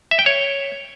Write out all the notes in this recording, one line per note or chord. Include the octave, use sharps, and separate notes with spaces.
E5
G5
C#5